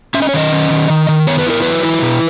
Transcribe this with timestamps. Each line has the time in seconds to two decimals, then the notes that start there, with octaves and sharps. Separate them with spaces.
0.14 C#4 E5
0.22 D#5
0.29 C#5
0.33 D#3 D#5
0.52 C#4
0.71 D#3
0.90 D#3
1.09 D#3
1.27 B3 C#5
1.39 B4
1.46 E4 A#4
1.62 F#3 B4
1.83 E4
2.02 B2